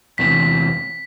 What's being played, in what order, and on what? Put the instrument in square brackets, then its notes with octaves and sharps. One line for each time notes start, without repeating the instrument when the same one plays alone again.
[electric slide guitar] E2 C3 E3 [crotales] B6